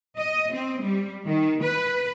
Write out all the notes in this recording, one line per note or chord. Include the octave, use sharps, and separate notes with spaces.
D#5
C4
G3
D#3
B4